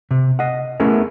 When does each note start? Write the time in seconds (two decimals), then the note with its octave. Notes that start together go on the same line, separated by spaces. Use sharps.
0.11 C3
0.39 D#5 F#5
0.80 A3 B3 C#4 E4 G#4 A#4